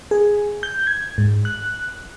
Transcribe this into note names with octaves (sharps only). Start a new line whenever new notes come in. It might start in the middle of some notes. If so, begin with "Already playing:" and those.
G#4
G6
G#6
G#2
F#6